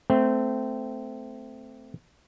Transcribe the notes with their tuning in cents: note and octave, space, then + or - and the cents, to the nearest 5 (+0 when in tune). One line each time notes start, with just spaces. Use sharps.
A3 +0 C4 -20